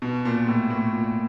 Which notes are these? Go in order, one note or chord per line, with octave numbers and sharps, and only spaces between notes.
B2
A#2
A2
A2
A#2